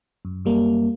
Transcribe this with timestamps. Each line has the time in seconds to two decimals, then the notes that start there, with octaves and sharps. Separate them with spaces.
0.25 F#2
0.45 F#2 G3 A#3